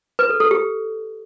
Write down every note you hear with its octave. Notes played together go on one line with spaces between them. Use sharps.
B4
A4
A4
G4